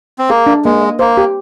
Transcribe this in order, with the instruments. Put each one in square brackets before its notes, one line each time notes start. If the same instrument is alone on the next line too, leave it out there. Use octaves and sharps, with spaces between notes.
[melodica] C4
[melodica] A#3 [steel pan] G#4
[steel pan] D4
[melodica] G#3 [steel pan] A#3
[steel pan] D#5
[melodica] A#3 [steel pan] C5
[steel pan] G4